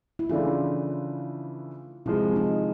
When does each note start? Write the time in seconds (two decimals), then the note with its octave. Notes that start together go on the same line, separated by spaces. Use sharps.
0.19 E4
0.30 C#3 E3 A3 D4 F4
2.06 C3 F3 G#3 E4
2.36 D#4